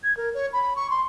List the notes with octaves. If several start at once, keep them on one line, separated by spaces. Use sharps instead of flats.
G#6
A#4
C#5
B5
C#6
C6